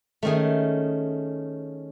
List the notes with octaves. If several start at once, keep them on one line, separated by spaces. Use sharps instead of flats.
D#3 A3 C#4 G#4